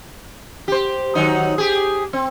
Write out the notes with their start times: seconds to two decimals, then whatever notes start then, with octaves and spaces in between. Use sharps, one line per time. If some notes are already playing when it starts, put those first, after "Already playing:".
0.68 G4 C5
1.15 D#3 F#3 D#4
1.58 G4 G#4
2.13 C4